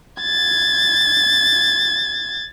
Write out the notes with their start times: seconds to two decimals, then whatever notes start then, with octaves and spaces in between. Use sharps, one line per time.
0.22 G#6 A6